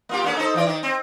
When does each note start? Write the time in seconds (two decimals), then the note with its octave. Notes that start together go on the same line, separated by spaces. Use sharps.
0.09 A#3 F4 G4
0.24 A#3 C#4 A4
0.37 D#4 A4 C5
0.54 E3 F4 D5
0.67 D#3
0.83 C4